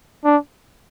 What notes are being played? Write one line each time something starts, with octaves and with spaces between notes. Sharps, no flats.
D4